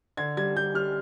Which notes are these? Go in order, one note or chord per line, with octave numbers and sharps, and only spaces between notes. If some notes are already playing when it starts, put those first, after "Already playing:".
D3 G#6
G3 G#6
G3 G6
G3 F6